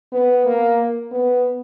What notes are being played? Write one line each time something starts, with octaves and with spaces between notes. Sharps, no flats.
B3
A#3
B3